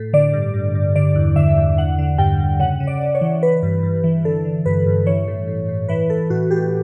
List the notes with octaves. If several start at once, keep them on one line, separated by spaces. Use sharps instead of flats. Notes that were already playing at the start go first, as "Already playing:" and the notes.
Already playing: A2
D3 D5
G2
G2
G2
D3 D5
E2
D3 E5
E2
D3 F#5
D3
G2 G5
G2
C#3 F#5
C#3
D5
C#3
C#5
E3
E3 B4
G2
G2
E3
D3 A4
D3
G2 B4
G2
E3 C#5
A2
A2
A2
E3 B4
E3 A4
A2 F#4
A2 G4